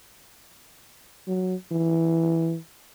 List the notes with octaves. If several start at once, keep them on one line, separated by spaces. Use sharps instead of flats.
F#3
E3